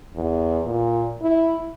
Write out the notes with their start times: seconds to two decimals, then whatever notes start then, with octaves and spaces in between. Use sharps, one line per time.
0.15 E2
0.65 A#2
1.22 E4